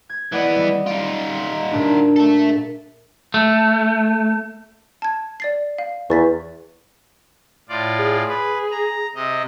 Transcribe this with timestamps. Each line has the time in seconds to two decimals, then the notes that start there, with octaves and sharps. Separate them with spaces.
0.09 G#6
0.33 E3 B3 D5 D#5 F#5
0.56 G3
0.87 D#4 F4 D7
1.72 A#2 D4
2.16 A4 E5
3.34 A3
5.02 A5 G#6
5.40 D5 A6 C7
5.78 F5
6.10 E2 C#6 A6 B6
7.69 A2 F4 D5
7.99 G#4
8.29 B4
8.71 A#5
9.15 C3 D#5